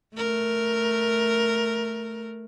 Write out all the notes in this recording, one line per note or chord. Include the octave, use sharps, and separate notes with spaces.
A3 A#4